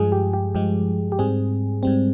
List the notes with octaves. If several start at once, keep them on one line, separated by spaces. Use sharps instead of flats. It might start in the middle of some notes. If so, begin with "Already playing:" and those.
Already playing: G2 F3 G#3 G#4
G4
G4
G2 F3 G#3 G4
G4
G#2 G3 C4 G#4
G#2 G3 C4